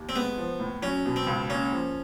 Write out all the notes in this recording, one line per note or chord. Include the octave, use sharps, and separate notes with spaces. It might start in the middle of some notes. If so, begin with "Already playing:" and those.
Already playing: D#2
C4
G#3 B3
F3
A2
F#3 C#4
B2
C4
C#2
A#3 C#4
F3